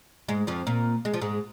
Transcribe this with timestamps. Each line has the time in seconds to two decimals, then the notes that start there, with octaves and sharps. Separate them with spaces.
0.28 G#2 G#3
0.47 F2 F3
0.67 A#2 A#3
1.05 G#3
1.14 F3
1.21 G#2 G#3